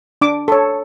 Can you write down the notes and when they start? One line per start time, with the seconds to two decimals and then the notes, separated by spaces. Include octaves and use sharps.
0.21 D4 D6
0.48 A4 C#5